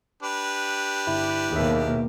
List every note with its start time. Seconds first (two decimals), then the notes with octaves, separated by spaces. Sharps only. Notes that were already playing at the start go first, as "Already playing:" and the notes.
0.23 D4 G4 B4
1.07 G1 E4
1.52 D#2 B2 A#3 G#4 E5